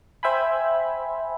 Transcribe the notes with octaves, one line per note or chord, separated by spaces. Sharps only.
C5 E5 G5 G#5 B5